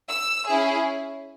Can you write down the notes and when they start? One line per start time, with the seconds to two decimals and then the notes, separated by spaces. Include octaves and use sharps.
0.09 E6
0.48 C#4 E4 G#4